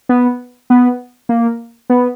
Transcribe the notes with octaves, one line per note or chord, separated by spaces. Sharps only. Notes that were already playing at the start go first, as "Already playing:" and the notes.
B3
B3
A#3
B3